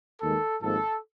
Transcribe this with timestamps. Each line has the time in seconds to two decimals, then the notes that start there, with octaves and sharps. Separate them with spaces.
0.20 D#2 D#3 G#3 A4
0.62 G#1 G#2 F3 A#3 A4